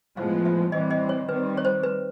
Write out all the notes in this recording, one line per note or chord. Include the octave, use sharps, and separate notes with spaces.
A2 F3 G#3 B3 F5
E5
E3 G3 C4 D#5
D#5
C#5
D#3 G3 C4 B4
C#5
C5
B4